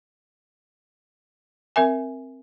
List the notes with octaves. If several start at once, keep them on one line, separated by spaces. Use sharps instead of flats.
C4 A#4 E5 G#5